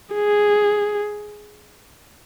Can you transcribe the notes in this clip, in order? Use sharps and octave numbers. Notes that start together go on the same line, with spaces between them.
G#4